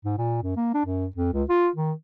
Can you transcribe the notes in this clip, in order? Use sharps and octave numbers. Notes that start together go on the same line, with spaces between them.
G#2
A#2
F#2
A#3
D4
F#2
F2
C#2
F4
D#3